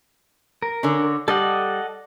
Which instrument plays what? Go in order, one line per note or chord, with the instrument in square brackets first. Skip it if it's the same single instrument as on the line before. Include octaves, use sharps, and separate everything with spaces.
[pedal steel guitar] A#4
[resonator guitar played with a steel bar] D3 C#4
[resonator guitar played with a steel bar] G3 [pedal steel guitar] A4 D#5 F#5